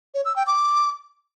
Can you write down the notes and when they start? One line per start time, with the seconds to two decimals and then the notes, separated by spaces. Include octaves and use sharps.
0.14 C#5
0.25 E6
0.36 G5
0.47 D6